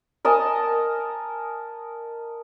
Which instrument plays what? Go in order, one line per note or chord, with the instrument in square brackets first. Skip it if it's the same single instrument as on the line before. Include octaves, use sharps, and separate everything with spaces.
[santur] A#4 D#5 G#5 A5